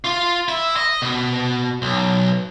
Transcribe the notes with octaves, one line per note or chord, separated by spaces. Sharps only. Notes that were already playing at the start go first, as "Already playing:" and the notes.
F4
E4
D#5
B2
B1